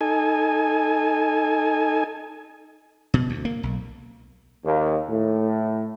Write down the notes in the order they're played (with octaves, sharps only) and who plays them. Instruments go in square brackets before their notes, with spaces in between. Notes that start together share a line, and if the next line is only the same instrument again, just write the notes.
[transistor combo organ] D#4 A4 G#5
[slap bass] B2
D2
A#3
B1
[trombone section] D#2
A2